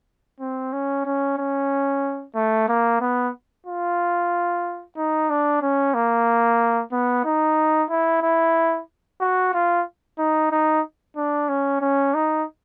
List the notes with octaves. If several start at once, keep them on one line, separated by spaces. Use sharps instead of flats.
C4
C#4
C#4
C#4
A3
A#3
B3
F4
D#4
D4
C#4
A#3
B3
D#4
E4
E4
F#4
F4
D#4
D#4
D4
C#4
C#4
D#4